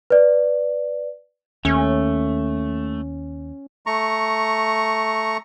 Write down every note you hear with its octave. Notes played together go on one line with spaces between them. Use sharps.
B4 D5
D#2 A3 C#4
A3 A#5 C#6